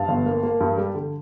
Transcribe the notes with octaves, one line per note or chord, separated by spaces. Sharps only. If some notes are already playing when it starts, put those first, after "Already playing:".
Already playing: G2 F5 A5
G1
A#3
A#3
G2
G3
D3